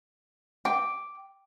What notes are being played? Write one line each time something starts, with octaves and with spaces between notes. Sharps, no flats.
G5 D6